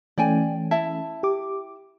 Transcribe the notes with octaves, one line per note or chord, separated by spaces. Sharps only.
E3 A3 C#4 D5 G5 G#5
E4 E5 A5
G4 D6